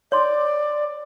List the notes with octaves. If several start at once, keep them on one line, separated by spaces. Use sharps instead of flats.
C#5 D5 C6